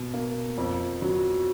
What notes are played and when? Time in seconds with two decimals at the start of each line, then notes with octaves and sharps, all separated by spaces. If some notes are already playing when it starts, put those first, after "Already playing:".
Already playing: B2
0.14 A#3
0.58 F2
1.02 F#3